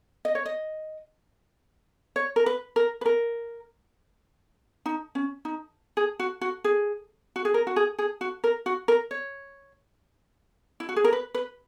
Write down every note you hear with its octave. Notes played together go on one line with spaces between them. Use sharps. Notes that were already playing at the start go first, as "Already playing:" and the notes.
D#5
C#5
D#5
C#5
A#4
B4
A#4
B4
A#4
D#4
C#4
D#4
G#4
F#4
F#4
G#4
F#4
G#4
A#4
F#4
G#4
G#4
F#4
A#4
F#4
A#4
C#5
E4
F#4
G#4
A#4
B4
B4